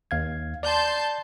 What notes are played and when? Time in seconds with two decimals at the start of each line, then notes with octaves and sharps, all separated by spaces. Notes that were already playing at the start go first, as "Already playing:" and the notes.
0.11 D#2 F5 G#6
0.63 D5 A5 C6 G6